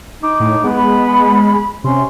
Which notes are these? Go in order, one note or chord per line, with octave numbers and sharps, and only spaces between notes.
D#4 D6
A2
G#3 B3
B5
C3 C#4 C6